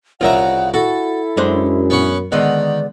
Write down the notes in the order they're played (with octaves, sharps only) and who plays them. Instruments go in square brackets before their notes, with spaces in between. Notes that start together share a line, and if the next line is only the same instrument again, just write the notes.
[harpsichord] C2 C#3 A#5 [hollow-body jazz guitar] F4 A#4 E5 [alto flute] F#5
[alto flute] E4 [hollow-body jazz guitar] F#4 [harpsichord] A4
[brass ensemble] F#2 [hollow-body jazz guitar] G#3 D4 C5
[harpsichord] B3 C#4 F#5
[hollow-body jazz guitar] D3 G#3 B3 [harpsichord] D#3 [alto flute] D5